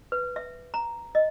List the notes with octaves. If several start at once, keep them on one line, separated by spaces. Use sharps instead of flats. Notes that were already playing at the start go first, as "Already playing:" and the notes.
B4
E5
A#5
D#5